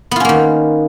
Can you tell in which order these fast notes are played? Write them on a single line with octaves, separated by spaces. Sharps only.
B3 F4 C#4 A#3 D#3